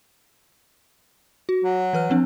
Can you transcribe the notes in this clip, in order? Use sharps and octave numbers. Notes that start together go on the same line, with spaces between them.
F#4
F#3
E3 B4 F6
F3 C4 D4